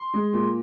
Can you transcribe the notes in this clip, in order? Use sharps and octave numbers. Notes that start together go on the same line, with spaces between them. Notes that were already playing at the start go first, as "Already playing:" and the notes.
Already playing: C6
G#3
A#2